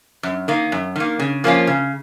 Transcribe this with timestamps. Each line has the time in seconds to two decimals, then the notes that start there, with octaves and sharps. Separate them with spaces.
0.23 F#2
0.48 D#3 A#3
0.72 F#2
0.96 D#3 A#3
1.19 C#3
1.44 F3 A#3 C#4 F4
1.67 C#3